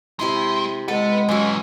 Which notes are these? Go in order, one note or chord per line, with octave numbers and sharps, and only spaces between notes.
C3 G#3 E4 C6
G#3 B3 A4 F#5
F#2 E3 C#4 F#4